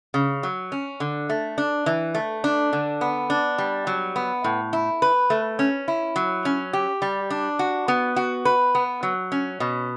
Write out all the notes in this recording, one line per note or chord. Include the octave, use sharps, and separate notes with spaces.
C#3
F#3
C#4
D3
A3
D4
E3
A3
D4
D3
B3
D4
G3
F#3
B3
A2
E4
B4
A3
C#4
E4
F#3
C#4
G4
G3
D4
F#4
B3
F#4
B4
B3
F#3
C#4
B2